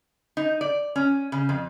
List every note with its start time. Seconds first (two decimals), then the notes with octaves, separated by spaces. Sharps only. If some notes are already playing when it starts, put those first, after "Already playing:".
0.37 D#4
0.61 D5
0.96 C#4
1.32 C#3
1.49 F2